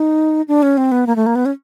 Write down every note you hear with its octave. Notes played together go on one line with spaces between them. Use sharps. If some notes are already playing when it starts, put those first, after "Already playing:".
Already playing: D#4
D4
C#4
C4
B3
A#3
A3
A#3
B3
C#4